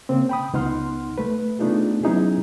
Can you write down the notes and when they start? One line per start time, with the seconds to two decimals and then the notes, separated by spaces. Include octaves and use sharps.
0.09 C#3 A#3 C4
0.29 G5 B5 D#6
0.53 C#2 B3 D#4 F#5 C6 F6
1.18 A3 B4
1.59 A3 B3 D4 D#4 F4 G#4
2.04 F#3 B3 C#4 D#4 E4 G#4